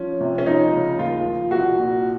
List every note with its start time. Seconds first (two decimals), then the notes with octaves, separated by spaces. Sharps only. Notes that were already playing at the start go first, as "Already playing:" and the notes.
Already playing: F3 C#4
0.20 C3
0.38 C#4
0.46 F3 D#4
0.73 C#3
0.99 D#2 F4
1.25 F3
1.51 C2 F#4
1.78 A#2